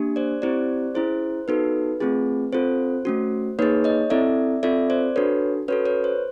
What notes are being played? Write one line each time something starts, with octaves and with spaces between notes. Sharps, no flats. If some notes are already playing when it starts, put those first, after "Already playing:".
Already playing: A#3 D4 G4
C5 D5
C4 E4 G4 C5 D5
C#4 E4 G#4 C5
B3 D#4 F#4 A4 B4
A3 C4 F4 G#4
C4 F4 A4 C5
A3 C#4 F#4
A#3 D#4 G#4 B4 C#5
C#5 D#5
C4 E4 A4 D5 E5
C4 F4 A4 D5 E5
C5 D5
D4 F#4 A4 B4 C#5
C#4 F#4 A4 B4 C#5
B4 C#5
C5